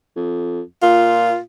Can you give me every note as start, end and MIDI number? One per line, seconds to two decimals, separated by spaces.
0.16 0.61 41
0.82 1.36 46
0.82 1.39 65